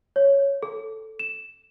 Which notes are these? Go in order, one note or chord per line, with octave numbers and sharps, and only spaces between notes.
C#5
A4
E7